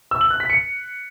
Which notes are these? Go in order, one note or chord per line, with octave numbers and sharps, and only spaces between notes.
E6
F#7
F#6
B6
C#7